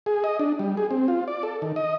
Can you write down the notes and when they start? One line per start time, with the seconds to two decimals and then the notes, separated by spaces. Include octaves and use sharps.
0.06 G#4
0.24 D#5
0.39 D4
0.59 G3
0.77 G#4
0.91 C4
1.08 F4
1.28 D5
1.43 A4
1.62 D#3
1.76 D#5